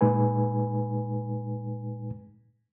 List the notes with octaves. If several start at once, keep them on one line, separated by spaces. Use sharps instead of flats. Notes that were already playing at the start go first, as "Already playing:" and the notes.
A#2 G#3 D#4 B4 G#5